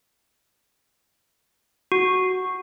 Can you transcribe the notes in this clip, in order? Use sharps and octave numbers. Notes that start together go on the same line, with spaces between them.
F#4